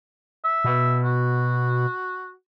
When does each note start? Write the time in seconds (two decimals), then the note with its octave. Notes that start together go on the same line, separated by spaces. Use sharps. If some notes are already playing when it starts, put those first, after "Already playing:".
0.44 E5
0.64 B2
1.05 F#4